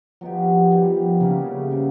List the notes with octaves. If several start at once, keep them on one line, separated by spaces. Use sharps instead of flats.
F3 F#3 B3 D#4 G4
D#3 G3 B3
C#3 A#3 C#4 E4 G4
C3 E3 G3 B3